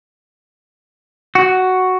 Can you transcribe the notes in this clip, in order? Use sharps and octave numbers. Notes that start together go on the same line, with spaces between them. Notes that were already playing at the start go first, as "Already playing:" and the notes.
F#4